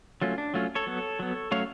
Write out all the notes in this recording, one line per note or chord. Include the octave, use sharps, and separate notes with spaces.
F#3 A3 C#4 F4
D4
F#3 A3 C#4 F4
A4 C#5
F#3 B3
F#3 B3
F#3 A3 C#4 C#5 F5